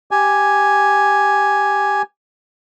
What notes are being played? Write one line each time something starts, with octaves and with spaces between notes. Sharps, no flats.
G4 G#5